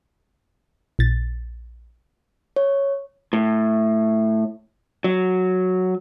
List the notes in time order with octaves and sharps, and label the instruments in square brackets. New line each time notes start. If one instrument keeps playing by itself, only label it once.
[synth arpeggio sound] A#1 A6
[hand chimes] C#5
[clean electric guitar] A2
F#3